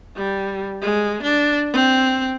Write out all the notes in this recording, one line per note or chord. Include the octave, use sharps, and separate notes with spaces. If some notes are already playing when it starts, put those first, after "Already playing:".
G3
G#3
D4
C4